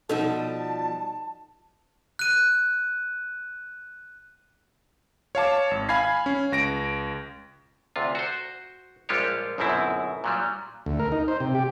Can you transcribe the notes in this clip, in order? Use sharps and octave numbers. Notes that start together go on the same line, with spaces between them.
B2 F3 G3 D#4 A4 A5
F#6 D#7
C#5 F5 A5 D6
G#1
F5 G#5 B5 G#6 C7
C#4
C#2 A#6 D7
D2 C3 F4
F#4 C5
A#1 G3 G#3 F4 G4 C#5
G1 F#2 B2 C4 E4
A#2 F#3 G3
D2
A#4
D#4
C5
C3
G4